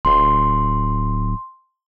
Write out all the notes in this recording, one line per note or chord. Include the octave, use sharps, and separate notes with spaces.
D1 C6